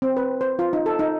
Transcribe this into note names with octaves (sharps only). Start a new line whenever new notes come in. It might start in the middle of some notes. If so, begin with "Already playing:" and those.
C4
B4
C5
F4
D#4
A4
D#4